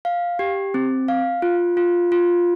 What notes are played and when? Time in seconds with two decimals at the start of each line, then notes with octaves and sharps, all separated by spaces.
0.05 F5
0.39 G4
0.74 C4
1.08 F5
1.42 F4
1.77 F4
2.12 F4